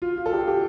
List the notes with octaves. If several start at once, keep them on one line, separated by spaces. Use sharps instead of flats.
F4
F4
A4
G4
G4